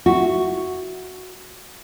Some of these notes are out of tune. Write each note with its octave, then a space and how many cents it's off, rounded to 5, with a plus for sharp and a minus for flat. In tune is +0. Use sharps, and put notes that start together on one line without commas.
F#4 +0 E5 +0